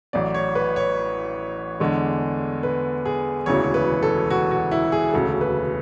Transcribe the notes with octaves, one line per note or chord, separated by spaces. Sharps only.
A1 A2 F#3 D5
C#5
B4
C#5
E2 D3 G#3
B4
G#4
E1 D2 C#3 E3 C#5
B4
A4
F#4
F#4
E4
G#4
E1 D2 C#3 A4
B4